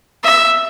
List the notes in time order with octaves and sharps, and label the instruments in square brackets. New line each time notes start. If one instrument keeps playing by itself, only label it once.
[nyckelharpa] E5